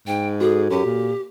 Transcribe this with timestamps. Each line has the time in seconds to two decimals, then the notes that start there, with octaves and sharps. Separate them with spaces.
0.07 G#2 G5
0.41 F#4 G#4 A4
0.70 F#2 G4
0.85 A#2